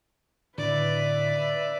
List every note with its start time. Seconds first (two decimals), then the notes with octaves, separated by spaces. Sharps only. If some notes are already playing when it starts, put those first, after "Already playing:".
0.58 A2 D3 B4 D5 E5